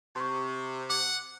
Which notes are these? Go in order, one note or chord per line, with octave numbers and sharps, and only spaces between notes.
C3 C6 C#6
F#5 D6